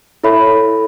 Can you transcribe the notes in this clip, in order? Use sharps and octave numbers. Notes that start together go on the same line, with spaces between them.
E4 A4 C#5 E5 B5